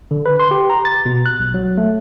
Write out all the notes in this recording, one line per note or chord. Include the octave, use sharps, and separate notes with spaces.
D3
B4
C6
G4
A#5
A6
B2
F#6
B1
F#3
A3